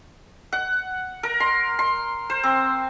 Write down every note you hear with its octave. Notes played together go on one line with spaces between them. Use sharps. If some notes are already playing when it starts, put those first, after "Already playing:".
F#5
A#4
C6
C6
C5
C4